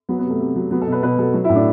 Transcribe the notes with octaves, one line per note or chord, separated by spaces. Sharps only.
F#3 B3
B3
C3
A3
C3
F#3
F#3 B3
A4
B2
B4
B2 B4
F#3 A4
F#3 F#4
E4
A2
D4